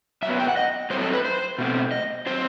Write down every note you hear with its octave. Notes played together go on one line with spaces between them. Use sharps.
F#2 F#3 B3 E5
G5
F#5
D#5
A2 F#3 A3 C4 C5
A4
B4
C5
B2 A3 C4
D#5
F#3 C4 C5